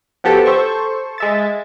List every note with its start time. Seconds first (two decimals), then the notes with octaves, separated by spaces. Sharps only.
0.24 F3 B3 F#4 G4 A4
0.46 A4 C5 C#6
1.18 G#3 E5 A6